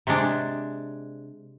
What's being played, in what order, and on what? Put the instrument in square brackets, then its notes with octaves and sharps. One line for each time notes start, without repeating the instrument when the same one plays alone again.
[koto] C3 G#3 D4